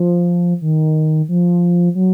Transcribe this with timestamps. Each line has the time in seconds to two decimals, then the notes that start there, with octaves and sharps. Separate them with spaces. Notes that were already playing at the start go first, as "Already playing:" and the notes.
Already playing: F3
0.62 D#3
1.29 F3
1.95 F#3